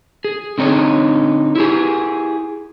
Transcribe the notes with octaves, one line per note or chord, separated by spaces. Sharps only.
G#4
D3 C4 D#4 C#5
E4 G4 G#4